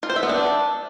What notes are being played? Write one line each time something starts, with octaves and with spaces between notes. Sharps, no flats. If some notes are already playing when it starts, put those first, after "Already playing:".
F4
C5
E5
B3
D4